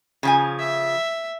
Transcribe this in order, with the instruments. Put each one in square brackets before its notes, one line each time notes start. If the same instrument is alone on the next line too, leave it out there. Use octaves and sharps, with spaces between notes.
[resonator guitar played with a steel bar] C#3 F3 G#5
[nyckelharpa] E5